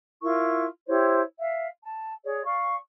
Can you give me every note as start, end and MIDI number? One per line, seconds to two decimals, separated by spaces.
0.22 0.65 64
0.22 0.65 65
0.22 0.65 70
0.22 0.65 85
0.87 1.20 64
0.87 1.20 67
0.87 1.20 72
0.87 1.20 73
1.38 1.66 76
1.38 1.66 77
1.81 2.11 81
2.25 2.45 68
2.25 2.45 73
2.25 2.45 74
2.45 2.75 74
2.45 2.75 77
2.45 2.75 85